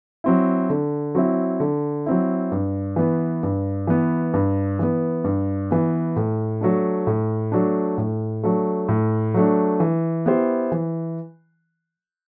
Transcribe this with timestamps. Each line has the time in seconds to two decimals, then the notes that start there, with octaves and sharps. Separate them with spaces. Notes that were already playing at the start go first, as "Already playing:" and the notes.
0.24 F#3 C4 E4
0.70 D3
1.15 F#3 C4 E4
1.60 D3
2.06 F#3 C4 E4
2.52 G2
2.96 E3 B3
3.43 G2
3.87 E3 B3
4.33 G2
4.79 E3 B3
5.24 G2
5.71 E3 B3
6.16 A2
6.61 F#3 A3 D4
7.07 A2
7.52 F#3 A3 D4
7.98 A2
8.43 F#3 A3 D4
8.88 A2
9.34 F#3 A3 D4
9.80 E3
10.26 B3 E4 G4 C5
10.72 E3